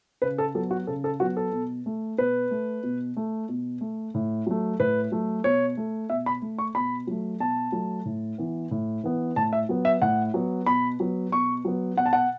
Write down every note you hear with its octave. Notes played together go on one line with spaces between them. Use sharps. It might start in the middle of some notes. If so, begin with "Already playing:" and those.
C#3 B4
A4
F#3 B3 A4
F#4
C#3 A4
A4
F#3 B3 F#4
A4
B2
A3
B2 B4
A3
B2
A3
B2
A3
A2
F#3 A3
A2 B4
F#3 A3
B2 C#5
A3
B2 E5
B5
A3
C#6
B2 B5
F#3 A3
B2 A5
F#3 A3
A2
E3 B3
A2
E3 B3
A2 A5
E5
F#3 B3
E5
A2 F#5
F#3 B3
B2 B5
F#3 B3
B2 C#6
F#3 B3
B2 F#5
A5
F#5